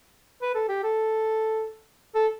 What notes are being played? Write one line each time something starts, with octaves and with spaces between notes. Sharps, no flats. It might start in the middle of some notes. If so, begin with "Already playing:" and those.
B4
A4
G4
A4
A4